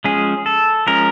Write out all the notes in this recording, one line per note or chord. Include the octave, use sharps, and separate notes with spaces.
F3 G#3 C#4 G#4
A4
F3 G#3 C#4 A#4